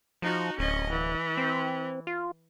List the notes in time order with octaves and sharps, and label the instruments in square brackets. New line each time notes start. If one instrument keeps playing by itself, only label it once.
[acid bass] F3 [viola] D#4 F#4
[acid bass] D1 [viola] C#4 D#5
[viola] E3
[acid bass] C4
F4